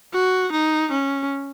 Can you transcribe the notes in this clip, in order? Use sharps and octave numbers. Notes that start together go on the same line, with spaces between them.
F#4
D#4
C#4